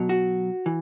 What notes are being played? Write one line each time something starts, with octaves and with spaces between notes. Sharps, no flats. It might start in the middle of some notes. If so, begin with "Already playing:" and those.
Already playing: B2 F#3
F#4
E3